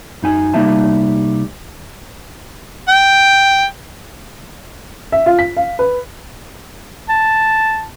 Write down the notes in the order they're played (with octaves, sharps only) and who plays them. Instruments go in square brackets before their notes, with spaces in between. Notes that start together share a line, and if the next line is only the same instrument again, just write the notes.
[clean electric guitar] F#2 D#4 G#5
C2 G3 A#3 D#4 E5 A5
[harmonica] G5
[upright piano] E5
F4
B6
F5
B4
[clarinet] A5